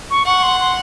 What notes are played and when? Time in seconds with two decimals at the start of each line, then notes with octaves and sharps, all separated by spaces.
0.10 C#6
0.26 F#5 C#6
0.42 C6
0.59 C6